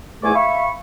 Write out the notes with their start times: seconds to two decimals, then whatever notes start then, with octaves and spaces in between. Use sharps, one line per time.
0.23 E2 G#2 A3 E4 G#5 D6
0.35 E5 F5 B5 C#6